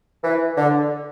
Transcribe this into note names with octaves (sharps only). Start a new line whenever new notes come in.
E3
D3